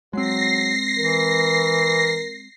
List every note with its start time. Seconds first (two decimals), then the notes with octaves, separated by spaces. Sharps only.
0.13 F#3 G#3 C4 A#6 C7
0.98 E3 A#4